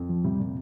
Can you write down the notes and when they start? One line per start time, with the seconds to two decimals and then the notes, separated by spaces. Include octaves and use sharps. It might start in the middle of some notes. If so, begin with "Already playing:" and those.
Already playing: F2
0.09 F3
0.24 C3 G3
0.39 A#2